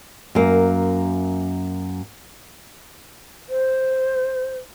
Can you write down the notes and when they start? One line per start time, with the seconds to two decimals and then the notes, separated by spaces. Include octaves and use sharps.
0.35 F#2 A#3
3.49 C5